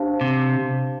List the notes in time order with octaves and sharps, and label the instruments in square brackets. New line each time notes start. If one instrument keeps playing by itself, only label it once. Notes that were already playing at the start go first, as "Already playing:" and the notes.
Already playing: [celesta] D4 G4 C5 F5 A5
[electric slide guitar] C3